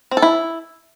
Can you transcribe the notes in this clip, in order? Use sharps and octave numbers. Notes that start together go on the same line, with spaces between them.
C4
A4
E4